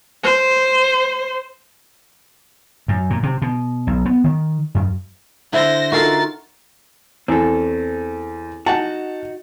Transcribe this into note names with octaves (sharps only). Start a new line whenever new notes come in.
C5
F#2
A#2
C3
B2
B1
B3
D#3
F#2
D3 E4 C5 A#6
D#4 F4 F#4 A4 A#4 C5 A6 C7
E2 C4 A4
D#4 F#4 F#5 A5